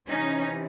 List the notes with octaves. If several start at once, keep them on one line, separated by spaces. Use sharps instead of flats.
C3 E3 C#4 D#4